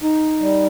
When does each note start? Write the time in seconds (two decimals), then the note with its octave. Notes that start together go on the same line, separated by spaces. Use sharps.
0.03 D#4
0.41 G3